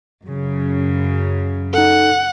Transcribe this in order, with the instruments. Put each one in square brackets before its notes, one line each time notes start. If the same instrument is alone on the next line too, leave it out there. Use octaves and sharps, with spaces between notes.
[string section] F#2 C#3
[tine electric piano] D#4 A4 [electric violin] F#5